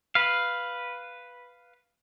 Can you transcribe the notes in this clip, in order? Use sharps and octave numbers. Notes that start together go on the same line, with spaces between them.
B4 F5